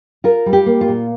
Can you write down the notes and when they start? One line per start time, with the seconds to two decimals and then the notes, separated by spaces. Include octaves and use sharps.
0.24 F4 A#4
0.46 G3
0.53 G4
0.66 A#3
0.81 F4
0.88 A#2